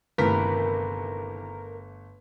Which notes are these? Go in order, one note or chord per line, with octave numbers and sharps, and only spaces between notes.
G1 D#2 C3 E3 A3 A#4 B4 B6